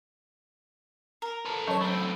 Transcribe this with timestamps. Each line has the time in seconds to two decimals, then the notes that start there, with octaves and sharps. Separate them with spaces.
1.22 A#4
1.46 A4 B4
1.68 F#3 C#4 C#5 D#5 A5 C#6
1.81 A3 C4 B5